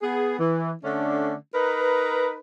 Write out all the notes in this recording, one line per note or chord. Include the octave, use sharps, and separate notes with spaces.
B3 G#4
E3
D3 A3 C#4 D4
D#4 A#4 B4